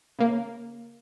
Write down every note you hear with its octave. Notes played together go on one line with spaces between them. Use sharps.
C#3 A#3